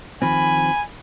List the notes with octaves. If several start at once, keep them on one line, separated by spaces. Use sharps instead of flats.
D#3 F3 C4 G#5 B5